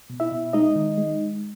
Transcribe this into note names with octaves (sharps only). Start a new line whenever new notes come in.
B2
E4 E5
B2
G#3 D#4 D#5
D#3
G#3